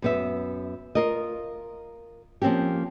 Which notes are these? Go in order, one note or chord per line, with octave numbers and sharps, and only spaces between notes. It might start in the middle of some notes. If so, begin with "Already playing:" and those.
F#2 B3 E5
F4 A#4 D#5
F3 A#3 C4 C#4 G4